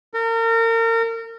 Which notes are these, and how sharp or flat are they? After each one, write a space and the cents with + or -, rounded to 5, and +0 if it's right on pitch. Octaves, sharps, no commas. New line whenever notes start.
A#4 -35